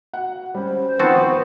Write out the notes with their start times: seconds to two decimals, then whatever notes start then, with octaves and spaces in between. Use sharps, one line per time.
0.13 F#4 F#5
0.54 G3 C#4 C5
1.00 D#3 F3 B3 C4 F#4 A5